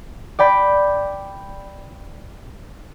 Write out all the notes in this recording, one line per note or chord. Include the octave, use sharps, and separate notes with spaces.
D5 G5 B5